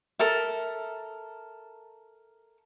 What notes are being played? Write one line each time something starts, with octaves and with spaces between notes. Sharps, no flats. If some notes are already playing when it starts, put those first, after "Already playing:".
A4 A#4 E5